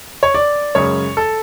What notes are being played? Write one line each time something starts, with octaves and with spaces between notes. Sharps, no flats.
C#5
D5
F#2 C#3 G#3 C#5
A4